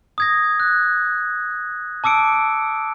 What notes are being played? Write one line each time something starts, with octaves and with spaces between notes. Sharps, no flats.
D#6 G#6 A#6
F#6
A5 D6 E6 C#7 D7